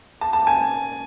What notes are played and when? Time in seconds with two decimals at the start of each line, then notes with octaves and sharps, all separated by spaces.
0.21 A5
0.33 A5
0.47 G#5